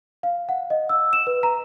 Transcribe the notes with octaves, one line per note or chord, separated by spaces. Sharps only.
F5
F#5
D#5
E6
E7
B4
A#5